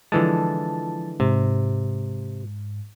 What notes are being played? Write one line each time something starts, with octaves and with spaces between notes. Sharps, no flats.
D3 E3 F3 G#3 A5
G#2 C3